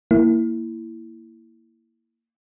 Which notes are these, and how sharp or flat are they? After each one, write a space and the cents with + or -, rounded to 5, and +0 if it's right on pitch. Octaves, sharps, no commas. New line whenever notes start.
A#3 -10 E4 +0